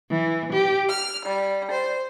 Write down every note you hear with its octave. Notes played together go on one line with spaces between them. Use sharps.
E3
G4
F6
G3
C5